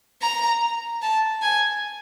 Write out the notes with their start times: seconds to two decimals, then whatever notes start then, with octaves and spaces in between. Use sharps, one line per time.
0.22 A#5
1.02 A5
1.42 G#5